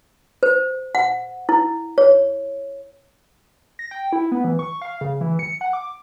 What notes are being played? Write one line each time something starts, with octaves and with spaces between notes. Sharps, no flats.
C5
F#5
E4
C#5
A#6
G5
E4
B3
E3
C#6
F5
C#3
E3
C#7
F#5
D6